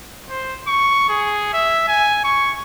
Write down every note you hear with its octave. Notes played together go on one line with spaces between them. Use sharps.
C5
C#6
G#4
E5
G#5
C#6